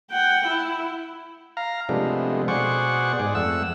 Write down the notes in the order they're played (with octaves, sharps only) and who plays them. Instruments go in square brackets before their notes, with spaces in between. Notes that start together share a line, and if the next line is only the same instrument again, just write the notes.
[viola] F#5 G5
E4
[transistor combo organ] F5 A#5
C3 F3 G#3 A3 B3 D4
B2 G#4 C5 D5 F#5 C#6
G#2 G#4 D5
F2 A3 F#5 E6